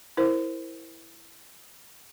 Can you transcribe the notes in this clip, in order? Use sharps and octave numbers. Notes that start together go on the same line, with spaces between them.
E4 A#4 C5